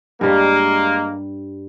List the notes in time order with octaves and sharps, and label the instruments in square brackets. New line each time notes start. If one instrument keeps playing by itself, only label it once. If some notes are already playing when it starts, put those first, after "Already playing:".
[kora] G2 G3 [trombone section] G#3 A#3